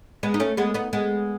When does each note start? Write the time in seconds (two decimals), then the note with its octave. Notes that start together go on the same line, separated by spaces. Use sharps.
0.23 G#3 B3
0.34 D#4
0.40 A3 C#4
0.57 G#3 B3
0.74 B3 D#4
0.93 G#3 B3